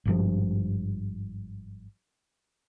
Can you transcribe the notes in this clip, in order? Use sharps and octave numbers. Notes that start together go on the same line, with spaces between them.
G#1 G2 F3